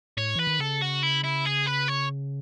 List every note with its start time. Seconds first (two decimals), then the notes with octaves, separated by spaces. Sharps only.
0.17 A2 C#5
0.35 E3 B4
0.47 D#3
0.59 C#3 A4
0.81 F#4
1.03 E4
1.24 E4
1.45 G#4
1.66 B4
1.88 C#5